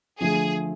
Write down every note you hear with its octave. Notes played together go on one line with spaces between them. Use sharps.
D3 F3 A3 G#4